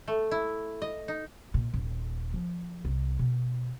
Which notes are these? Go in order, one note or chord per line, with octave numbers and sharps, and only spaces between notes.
A3
E4
D#5
D#4
A#2
D#1
F3
C2
B2